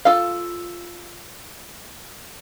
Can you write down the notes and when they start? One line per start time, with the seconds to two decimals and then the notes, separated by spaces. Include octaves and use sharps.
0.05 F4 A4 F5